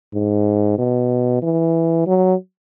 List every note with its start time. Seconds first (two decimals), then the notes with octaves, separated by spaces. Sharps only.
0.14 G#2
0.78 B2
1.42 E3
2.07 F#3